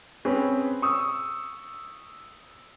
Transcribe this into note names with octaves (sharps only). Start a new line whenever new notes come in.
C4 C#4 G#4 B4
C#6 D#6 E6